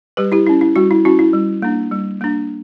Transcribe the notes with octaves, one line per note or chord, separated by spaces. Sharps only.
G3 G4 B4
E4 G4
C#4 E4
E4
G3 F#4
E4
C#4 E4 F#4
E4
G3
A#3 D4
G3
A#3 D4